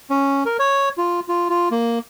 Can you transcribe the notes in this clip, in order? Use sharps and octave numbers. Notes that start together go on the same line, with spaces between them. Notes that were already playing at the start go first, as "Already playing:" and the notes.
C#4
A#4
C#5
F4
F4
F4
A#3